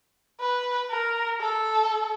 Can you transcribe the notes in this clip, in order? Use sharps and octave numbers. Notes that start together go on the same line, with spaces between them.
B4
A#4
A4